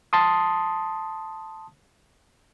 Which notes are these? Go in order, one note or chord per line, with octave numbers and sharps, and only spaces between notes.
A5 C6 D#6